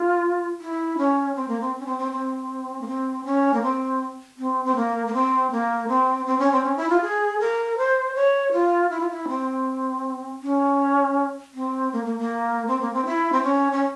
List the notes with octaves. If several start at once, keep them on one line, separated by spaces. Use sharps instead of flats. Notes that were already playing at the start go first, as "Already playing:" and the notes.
Already playing: F4
E4
C#4
C4
A#3
C4
C#4
C4
C4
C4
A#3
C4
C#4
A#3
C4
C4
C4
A#3
A#3
C4
A#3
C4
C4
C#4
C4
C#4
E4
F4
G#4
A#4
C5
C#5
F4
E4
F4
E4
C4
C#4
C4
A#3
A#3
A#3
C4
A#3
C4
E4
C4
C#4
C#4